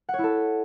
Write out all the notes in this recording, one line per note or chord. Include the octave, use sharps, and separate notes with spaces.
F#5
C#5
E4
A4